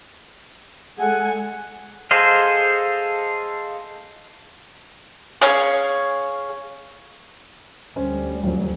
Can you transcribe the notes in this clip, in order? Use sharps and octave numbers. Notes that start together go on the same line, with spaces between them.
G#3 A4 F#5 G#5
G#4 A4 C5 D#5 F5
C#4 G#4 C#5 F5
D2 G3 C#4 C5
D#1 F#2 F#3